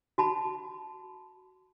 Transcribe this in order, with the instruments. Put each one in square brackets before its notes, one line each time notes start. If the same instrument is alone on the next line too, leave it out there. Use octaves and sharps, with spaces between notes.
[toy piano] F#4 A5 B5